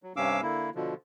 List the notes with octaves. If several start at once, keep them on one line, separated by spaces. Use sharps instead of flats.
F#3
G2 C3 C#4 F5 D6 E6
D3 A#3 E4
B2 D3 F3